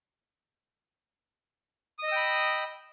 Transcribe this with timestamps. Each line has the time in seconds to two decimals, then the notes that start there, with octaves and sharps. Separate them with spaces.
1.99 D#6
2.03 D#5
2.08 E6
2.12 G5
2.16 B5